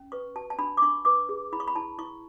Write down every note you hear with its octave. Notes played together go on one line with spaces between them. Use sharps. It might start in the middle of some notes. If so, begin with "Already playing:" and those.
Already playing: C#4
B4 C#6
F#4 A5
A5
D4 B5
D6
D4 C#6
B4 D6
G#4
E4 B5
C#6
B5
E4 A5
E4 C#6